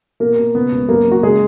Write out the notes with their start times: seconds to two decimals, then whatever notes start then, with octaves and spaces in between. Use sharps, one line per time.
0.20 B2 A#3 A#4
0.38 B2
0.55 C#3 B3 B4
0.72 C#2
0.89 F#2 A#3 A#4
1.06 F#2
1.11 F#4
1.23 C#3 G#3 G#4